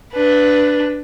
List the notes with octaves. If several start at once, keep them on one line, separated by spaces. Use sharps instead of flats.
D4 B4